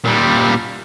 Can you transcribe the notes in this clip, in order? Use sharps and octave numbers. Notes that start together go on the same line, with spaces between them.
A#2 G3